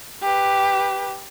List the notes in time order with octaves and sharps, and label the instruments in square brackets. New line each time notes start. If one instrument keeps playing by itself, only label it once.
[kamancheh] G4 B4